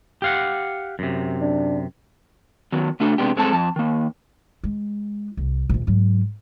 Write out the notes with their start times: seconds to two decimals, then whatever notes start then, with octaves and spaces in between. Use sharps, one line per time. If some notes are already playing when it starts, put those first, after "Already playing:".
0.22 G4 F5 F#5
0.99 F#2 C3
1.41 D4
2.72 D#3 F#3 B3
3.00 C#3 A3 D4 F#4 A4
3.18 C3 D#3 G#3 B3 D4 G4
3.36 G2 G#3 C4 A4 A5
3.53 F2 A5
3.76 D#3 A#3
4.64 G#3
5.37 C2
5.69 A#1 D#2
5.87 G#2 F#3